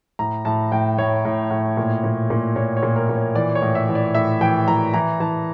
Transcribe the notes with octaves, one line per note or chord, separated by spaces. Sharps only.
A2 A#5
A2 A5
A2 G5
A2 C#5
A2
A2
A#2
A#2
A#2
A#2 C#5
C#5
A#2
A#4
A#2
C#5
E3 D5
C#5
A2
E5
E3
D5
A2 E5
E3 G5
E3 A#5
E3 A#5
E3 A5